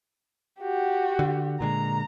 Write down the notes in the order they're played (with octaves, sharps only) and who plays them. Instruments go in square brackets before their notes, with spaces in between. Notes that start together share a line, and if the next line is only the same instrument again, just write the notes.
[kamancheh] F#4 G4
[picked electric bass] D3
[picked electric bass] A#2 D3 G#3 [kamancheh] A#5